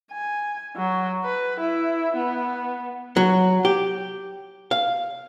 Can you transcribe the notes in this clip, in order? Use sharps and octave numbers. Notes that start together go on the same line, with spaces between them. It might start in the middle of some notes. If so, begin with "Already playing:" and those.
G#5
F#3
B4
E4
B3
F#3
G4
F5